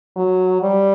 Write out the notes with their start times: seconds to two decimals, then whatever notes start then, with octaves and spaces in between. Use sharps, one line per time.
0.16 F#3
0.62 G3